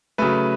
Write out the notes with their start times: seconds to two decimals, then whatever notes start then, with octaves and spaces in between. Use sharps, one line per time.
0.18 C#3 F#3 A3 B4